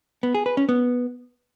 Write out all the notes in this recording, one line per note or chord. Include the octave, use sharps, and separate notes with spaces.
B3
G#4
B4
C#4
B3